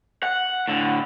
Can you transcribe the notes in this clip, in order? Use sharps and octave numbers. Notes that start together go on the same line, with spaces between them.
F#5
A2 D3